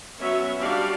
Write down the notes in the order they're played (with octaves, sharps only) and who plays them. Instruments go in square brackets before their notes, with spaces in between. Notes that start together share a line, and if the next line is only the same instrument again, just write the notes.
[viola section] F#3 B3 C#4 F#4 C#5 E5
G3 D4 F#4 G4 D5 F5